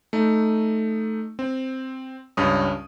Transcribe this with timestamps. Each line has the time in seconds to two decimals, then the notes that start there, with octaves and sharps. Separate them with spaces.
0.13 A3 D#4
1.39 C4
2.37 C#2 G2 C#4 D#6